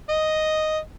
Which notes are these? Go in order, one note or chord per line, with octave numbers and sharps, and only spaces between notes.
D#5